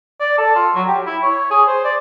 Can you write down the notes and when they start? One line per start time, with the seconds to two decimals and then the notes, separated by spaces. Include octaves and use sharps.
0.20 D5
0.38 A4
0.55 F4
0.75 F#3
0.88 G4
1.06 E4
1.23 C#5
1.51 G#4
1.68 C5
1.85 D5